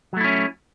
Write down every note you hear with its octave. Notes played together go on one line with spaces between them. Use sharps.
F#3 A3 C#4 E4